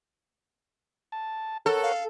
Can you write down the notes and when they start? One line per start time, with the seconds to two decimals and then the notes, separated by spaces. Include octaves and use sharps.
1.12 A5
1.66 A4 A#4 C#5 F#5
1.83 F5